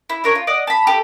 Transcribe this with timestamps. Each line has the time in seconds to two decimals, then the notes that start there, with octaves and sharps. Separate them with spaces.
0.09 E4
0.24 D4 A#4 C#5
0.35 F4
0.47 D5 D#5 F#5
0.67 A5 B5
0.87 G4 A4